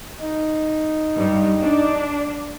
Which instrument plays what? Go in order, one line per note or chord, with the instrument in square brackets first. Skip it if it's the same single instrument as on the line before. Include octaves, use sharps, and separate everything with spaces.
[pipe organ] D#4
[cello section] G2
D4